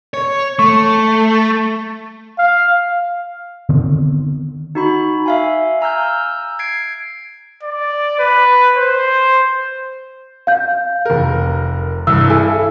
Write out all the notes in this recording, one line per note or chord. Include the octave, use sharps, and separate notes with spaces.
C#5
A3 C#6
F5
D3 D#3 B3 C4
D#4 F#4 B5
E5 F5 G#5
G#5 A#5 E6 F6 G6
E6 G6
G#6 C7 D7
D5
B4
C5
F5 G6
F1 A#4
C2 G2 E6
E4 A4 G#5